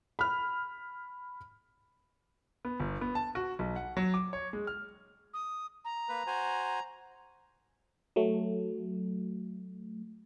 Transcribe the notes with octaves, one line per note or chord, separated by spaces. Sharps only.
B5 F6
B3
G1
B3
A5
F#4
B1
F#5
F#3
D6
C#5
G#3
F6
D#6
A#5
A#3 B4
F#4 C5 G#5
F#3 A3